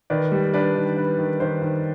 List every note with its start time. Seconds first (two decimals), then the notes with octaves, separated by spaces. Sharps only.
0.10 D#3 B4 D5
0.32 G3
0.53 D4 B4 D5
0.75 D#3
0.97 D4 B4
1.18 D#3
1.40 D#3 C5
1.62 D#3